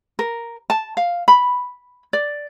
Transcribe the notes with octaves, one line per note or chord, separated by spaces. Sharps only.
A#4
A5
F5
B5
D5